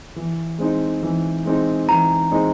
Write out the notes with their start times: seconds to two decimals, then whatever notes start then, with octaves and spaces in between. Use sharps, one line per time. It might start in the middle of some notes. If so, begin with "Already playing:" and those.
0.16 E3
0.58 G#3 C4 D#4
1.03 E3
1.46 G#3 C4 D#4
1.88 E3 A#5
2.32 G#3 C4 D#4